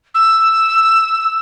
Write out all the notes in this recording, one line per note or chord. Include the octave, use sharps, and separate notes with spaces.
E6